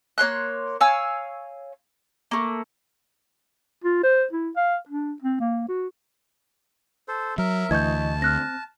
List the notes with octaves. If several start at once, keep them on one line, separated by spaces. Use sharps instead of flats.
A#3 C#5 C6 F#6
C#5 F5 G#5 E6
A3 A#3
F4
C5
E4
F5
D4
C4
A#3
F#4
A4 C5
F#3 A#4 E5
D2 E3 D#5 A5 C#6 G6 G#6
C4 F6 F#6 A#6